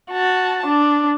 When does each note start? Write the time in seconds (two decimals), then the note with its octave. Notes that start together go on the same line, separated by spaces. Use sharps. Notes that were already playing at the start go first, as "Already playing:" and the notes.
0.12 F#4 A5
0.66 D4